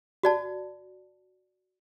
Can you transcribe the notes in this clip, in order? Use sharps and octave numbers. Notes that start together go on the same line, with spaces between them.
F#4 D5 A5